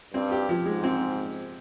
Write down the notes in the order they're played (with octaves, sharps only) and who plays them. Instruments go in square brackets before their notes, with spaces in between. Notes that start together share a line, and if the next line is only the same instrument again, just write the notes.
[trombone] G2 [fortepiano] C4
[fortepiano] G4
F3
[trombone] G#2 [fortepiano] G#3
[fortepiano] C4